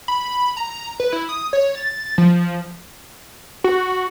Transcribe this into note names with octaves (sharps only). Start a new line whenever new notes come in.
B5
A#5
B4
E4
D#6
C#5
A6
F3
F#4